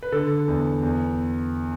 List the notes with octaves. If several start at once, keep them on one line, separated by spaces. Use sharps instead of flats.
B4
D3 A4
E2
E2